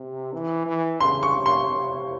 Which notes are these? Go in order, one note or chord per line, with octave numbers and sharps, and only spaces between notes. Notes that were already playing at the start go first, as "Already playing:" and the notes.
Already playing: C3
E3
E3
C#3 C6
C#6
C3
C6
C3